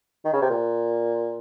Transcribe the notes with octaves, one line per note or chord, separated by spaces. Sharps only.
D#3
C#3
C3
A#2